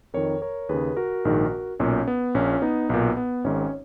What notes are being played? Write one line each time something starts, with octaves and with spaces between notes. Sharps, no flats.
F2 D#3 A#4 C#5
A#4 C#5
D#2 C#3 G#4 B4
F#4 A#4
A#1 G#2 D#3
B1 A#2 C#4
B3
A#1 A#2 C#4
B3 D#4
B1 A#2 B3
B3
G#1 G#2 D#3 C#4
C#5